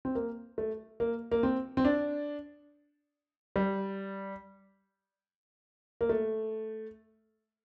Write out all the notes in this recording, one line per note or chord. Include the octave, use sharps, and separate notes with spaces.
C4
A#3
A3
A#3
A#3
C4
C4
D4
G3
A#3
A3